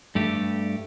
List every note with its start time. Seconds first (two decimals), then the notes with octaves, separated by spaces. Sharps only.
0.15 G2 A3 G4